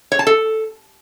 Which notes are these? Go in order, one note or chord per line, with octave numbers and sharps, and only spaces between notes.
C#5
A5
A4